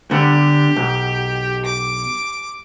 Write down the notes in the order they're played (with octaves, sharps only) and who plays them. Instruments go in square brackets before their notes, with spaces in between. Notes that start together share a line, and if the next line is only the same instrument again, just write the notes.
[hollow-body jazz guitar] D3 B3 [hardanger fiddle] G4
[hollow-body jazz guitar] B1
[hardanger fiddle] D6